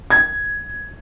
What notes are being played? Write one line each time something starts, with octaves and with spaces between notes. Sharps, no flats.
G#6